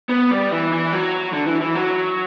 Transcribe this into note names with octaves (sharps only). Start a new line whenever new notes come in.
B3
G3
E3
E3
F#3
D3
E3
E3
F#3